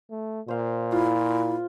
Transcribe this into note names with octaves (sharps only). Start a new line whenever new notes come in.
A3
A#2 C5 F5
E4 F4